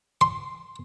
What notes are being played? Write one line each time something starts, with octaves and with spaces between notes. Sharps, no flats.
C6